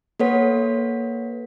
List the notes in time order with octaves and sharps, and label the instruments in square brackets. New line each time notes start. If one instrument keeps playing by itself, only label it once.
[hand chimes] A#3 A4 B4 C#5 F#5 B6